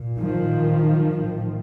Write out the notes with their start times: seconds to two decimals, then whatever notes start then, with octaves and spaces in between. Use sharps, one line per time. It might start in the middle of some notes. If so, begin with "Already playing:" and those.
Already playing: A#2
0.19 D#3 F3
1.15 A2